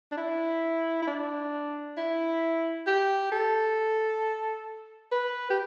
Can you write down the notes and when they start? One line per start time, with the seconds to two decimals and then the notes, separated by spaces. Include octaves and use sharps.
0.12 D4
0.17 E4
1.02 E4
1.07 D4
1.97 E4
2.87 G4
3.32 A4
5.12 B4
5.50 G4